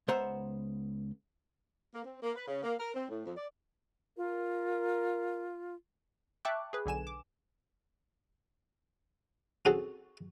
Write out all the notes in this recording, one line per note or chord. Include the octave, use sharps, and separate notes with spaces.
C#2 B3 C5 E5 F#5 A#5
A#3
C4
A#3
B4
C#3
A#3
A#4
C4
A2
F2
D5
F4 A#4
E5 G5 A5 C#6 D6 F#6
G#4 B4
B1 D3 G#5 E7
D6
C4 C#4 F#4 G#4 A4